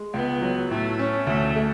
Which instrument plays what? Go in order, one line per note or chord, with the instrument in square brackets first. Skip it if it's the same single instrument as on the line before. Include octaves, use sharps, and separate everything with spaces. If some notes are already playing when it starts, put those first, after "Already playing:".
Already playing: [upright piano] G#3
[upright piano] C#2 [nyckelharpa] B3
[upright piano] F#3
[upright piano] A2 [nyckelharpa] A3
[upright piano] C#4
[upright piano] D2 [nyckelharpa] A3
[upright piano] A3